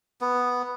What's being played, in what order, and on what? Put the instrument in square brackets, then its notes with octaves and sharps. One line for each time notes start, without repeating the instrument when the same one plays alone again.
[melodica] B3